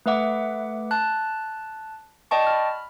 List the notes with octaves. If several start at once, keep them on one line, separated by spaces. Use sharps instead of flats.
A3 B4 E5 F#5 D6
A5 F#6
D5 D#5 G5 A5 C#6
B5 F6